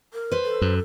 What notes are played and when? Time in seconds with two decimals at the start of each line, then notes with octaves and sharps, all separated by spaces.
0.13 A#4
0.31 B4 C5
0.45 A4
0.61 F#2